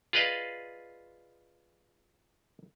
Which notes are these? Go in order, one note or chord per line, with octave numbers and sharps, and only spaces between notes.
F4 G#4 B4 D5 D#5 F5